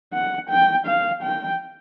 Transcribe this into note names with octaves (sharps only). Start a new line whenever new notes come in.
F#5
G5
F5
G5